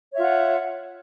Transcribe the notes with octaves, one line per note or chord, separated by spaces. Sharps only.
F4 C#5 E5 F#5